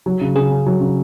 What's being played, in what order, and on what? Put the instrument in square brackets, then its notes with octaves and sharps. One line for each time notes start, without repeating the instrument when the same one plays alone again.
[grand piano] F#3
C#3
[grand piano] C#3 [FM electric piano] G#4
[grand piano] C#4
F#3
C#3